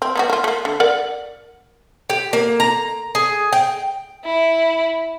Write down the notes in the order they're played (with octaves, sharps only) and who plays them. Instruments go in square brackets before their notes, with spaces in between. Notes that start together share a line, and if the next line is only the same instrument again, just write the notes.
[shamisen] C4
B3 D#4 F#4
A#3 F4
A3 A#3
D3
A#4 D5 F#5
[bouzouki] G4
A#3
A#5
G#4
G5
[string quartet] E4